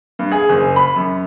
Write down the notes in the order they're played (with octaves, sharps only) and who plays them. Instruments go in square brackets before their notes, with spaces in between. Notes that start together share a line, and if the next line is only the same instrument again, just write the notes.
[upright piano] G2
G#4
F#1
B5
F#2